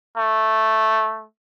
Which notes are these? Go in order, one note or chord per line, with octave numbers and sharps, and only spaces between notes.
A3